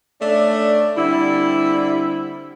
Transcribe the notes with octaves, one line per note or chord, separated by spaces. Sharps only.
A3 C#4 D4 D5
D3 G3 C4 E4